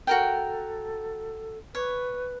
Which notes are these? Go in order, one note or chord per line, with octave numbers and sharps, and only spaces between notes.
F#4 A4 A#4 G5
B4 C#5